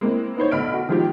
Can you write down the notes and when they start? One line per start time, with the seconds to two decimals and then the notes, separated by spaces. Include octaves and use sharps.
0.01 G#3 A#3 C4 E4
0.37 B3 D#4 C5 C#5
0.51 B1 D3 B5 F6 D7
0.74 F#4
0.89 D#3 F3 G#3 F4 G4